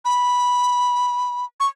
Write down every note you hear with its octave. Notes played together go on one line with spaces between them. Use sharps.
B5
C#6